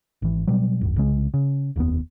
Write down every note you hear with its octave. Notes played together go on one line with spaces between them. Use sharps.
G#1 E3
B2 F#3 G3
D1 G#1 F#2
C2 C#3 G#3
C#3
F1 D#2 D3 B3